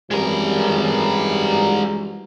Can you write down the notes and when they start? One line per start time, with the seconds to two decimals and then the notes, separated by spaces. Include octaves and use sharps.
0.11 F#2 E3 G3 G#3 A#4